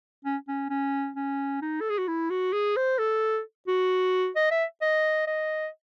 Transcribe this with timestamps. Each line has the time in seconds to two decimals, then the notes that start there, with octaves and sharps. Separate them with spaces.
0.25 C#4
0.48 C#4
0.70 C#4
1.16 C#4
1.62 D#4
1.81 A4
1.90 G#4
1.98 F#4
2.08 E4
2.30 F#4
2.53 G#4
2.76 C5
2.99 A4
3.68 F#4
4.36 D#5
4.51 E5
4.82 D#5
5.27 D#5